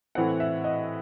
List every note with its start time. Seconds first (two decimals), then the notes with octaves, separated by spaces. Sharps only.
0.15 A2 E3 C4 F#5
0.40 E5
0.64 D#5